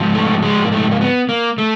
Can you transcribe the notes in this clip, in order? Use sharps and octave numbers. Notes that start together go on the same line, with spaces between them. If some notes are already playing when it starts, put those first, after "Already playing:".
Already playing: G#2 F3
A3
G#3
A#3
A3
A#3
B3
A#3
A3